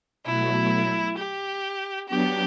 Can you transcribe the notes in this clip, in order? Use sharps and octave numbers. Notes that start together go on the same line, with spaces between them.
B2 F#3 A3 E4
G4
F#3 B3 D4 G4